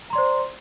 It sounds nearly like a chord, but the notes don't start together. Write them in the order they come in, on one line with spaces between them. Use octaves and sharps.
A#5 C6 D5 C5